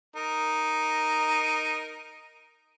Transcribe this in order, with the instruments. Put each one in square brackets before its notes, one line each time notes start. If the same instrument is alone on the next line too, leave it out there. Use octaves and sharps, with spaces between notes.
[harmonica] D#4 A#4